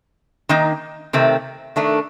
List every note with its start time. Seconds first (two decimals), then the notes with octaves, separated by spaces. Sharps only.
0.49 D#3 A#3 D#4
1.13 C3 D#3 A3 C4
1.76 D#3 A3 D4